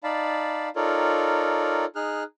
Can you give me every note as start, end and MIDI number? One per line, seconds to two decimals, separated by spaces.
0.04 0.69 63
0.04 0.69 74
0.04 0.69 77
0.04 0.69 81
0.04 0.69 83
0.76 1.85 63
0.76 1.85 65
0.76 1.85 69
0.76 1.85 70
0.76 1.85 73
0.76 1.85 74
1.96 2.23 63
1.96 2.23 68
1.96 2.23 89
1.96 2.23 90